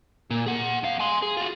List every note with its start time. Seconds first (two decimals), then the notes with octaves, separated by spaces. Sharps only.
0.31 A#2
0.46 G#4 F#5
0.83 F2 F5
0.99 G#5 C6
1.22 G#4
1.37 F4 F#4